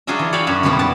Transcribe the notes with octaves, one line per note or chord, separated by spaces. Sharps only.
F#3 D4 F4 G#4 D#5 E5
E3
C#5 D5 E5 F5 G5 B5
F#2 F#4 G#5
F2 B2 F3 G3 B3 E4
G2 B4 D5 A5